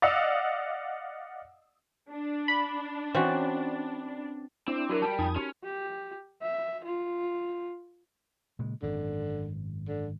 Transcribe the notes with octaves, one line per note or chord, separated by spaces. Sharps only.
D5 D#5 F5 F#5 D#6 E6
D4
B5
E3 C4 C#4 F#4
C4 D4 E4
F#3 F#4 A#4
G3 G5 A5
F2 D#4 G#5 B5 D#6
C#4 F#4 G4
G4
E5
F4
A#2 C#3 G#3
G#1 F#2 D3
D3